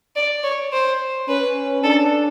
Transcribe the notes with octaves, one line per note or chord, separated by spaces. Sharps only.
D5
C#5
C5
C#4 B4
D4 A4